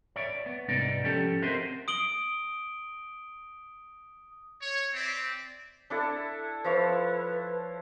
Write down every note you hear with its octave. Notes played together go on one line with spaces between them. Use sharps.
C#5 D5 E5
B3
C2 G#2 B3 D#4 D5
F3 C#4 G4 A4
C4 F#4 A#4 C5 D#5 E5
D#6 D7 F#7 G7
C#5
C4 D5 E5
D4 E4 A4
F3 E4 B4 C#5